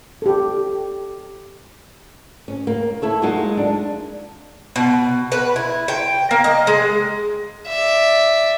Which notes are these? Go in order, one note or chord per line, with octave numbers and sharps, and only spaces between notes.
G4 A4
C#4
A#3
E4 A4 C#5
F#3 G#3 A#3 D#4 F4 F#4
D4
B2
B4
E4
G5
A#3
D#5
G#3
D5 E5